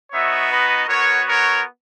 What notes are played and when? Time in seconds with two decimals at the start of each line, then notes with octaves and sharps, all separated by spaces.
0.12 B3 D#4 F#4 C#5 E5
0.50 B4 D#5
0.88 B3 F#4 A#4 C#5
1.26 A#4 C#5